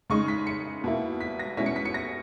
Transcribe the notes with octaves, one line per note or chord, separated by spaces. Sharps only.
C#3 G#3 D#4 C#6
B6
C#7
B2 A#3 E4
B6
A#6
B2 G#3 C#4 E4 B6
C#7
B6
C#7
A#6